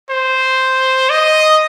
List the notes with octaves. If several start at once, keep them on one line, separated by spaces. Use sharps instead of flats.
C5
D#5